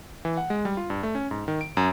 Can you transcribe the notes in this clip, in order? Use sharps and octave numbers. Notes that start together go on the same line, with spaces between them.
E3
F#5
G#3
G3
F4
G2
A3
C#4
G#2
D#3
D7
F#2